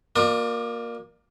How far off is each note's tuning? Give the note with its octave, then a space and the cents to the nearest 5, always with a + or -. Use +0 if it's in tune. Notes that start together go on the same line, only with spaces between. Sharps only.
A#3 +5 F4 +40 D5 +40